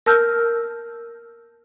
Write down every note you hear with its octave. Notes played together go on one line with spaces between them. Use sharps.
A#4 A5 E6 F6 G6